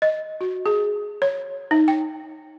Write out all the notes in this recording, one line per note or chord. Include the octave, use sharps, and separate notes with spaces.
D#5
F#4
G#4
C#5
D#4
G5